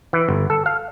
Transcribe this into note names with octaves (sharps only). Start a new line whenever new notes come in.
E3
G1
A4
F5